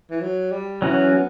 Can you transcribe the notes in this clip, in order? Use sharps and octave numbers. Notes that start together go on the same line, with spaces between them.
E3
F#3
G3
E3 F#3 C#4 F#4
B3